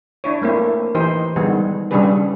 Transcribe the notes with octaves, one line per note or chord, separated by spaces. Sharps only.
D4 E4 C#5
A3 A#3 C4 E4
E3 D#4 G4 C5
D3 D#3 G3 G#3 B3 G#4
C#3 G3 C#4 D4 G#4 B4